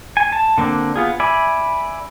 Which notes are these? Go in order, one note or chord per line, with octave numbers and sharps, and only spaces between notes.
G#5
A5
D3 A#3 C4 D4
B3 F4 G#4
D5 E5 G#5 B5